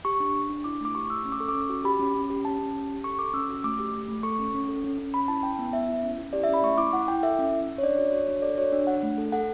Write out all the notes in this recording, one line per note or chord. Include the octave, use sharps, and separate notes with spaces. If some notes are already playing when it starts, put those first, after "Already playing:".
G4 C#6
D4
D4
D4
E4 D6
A3 D6
G4 C#6
A3 E6
C#4 E6
D6
A4 C#6
D6
C#4
F#4
G4 B5
C#4
C#4
G4
C#4 A5
C#4
G4
G4
A4 C#6
A4 D6
C#4 E6
F#4
A3 D6
G4
A3
A3
A4 C#6
C#4
C#4
A4
C#4
C#4
C#4 B5
E4 A5
E4 G5
B3
B3 E5
E4
C#4
E4
G4 D5
E5
C#4 B5
A3 C#6
E4 D6
E4 F#5
E4 G5
A4 E5
C#4
C#4
C#4
C#5
D4 D5
F#4 C#5
F#4 C#5
D4
A4 D5
F#4 C#5
D4
D4 F#5
A3
A4
A4 F#5